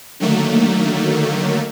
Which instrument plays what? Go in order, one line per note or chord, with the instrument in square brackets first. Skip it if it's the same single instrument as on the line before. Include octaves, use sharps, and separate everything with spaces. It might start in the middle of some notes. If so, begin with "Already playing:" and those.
[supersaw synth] D3 D#3 F#3 A3 A#3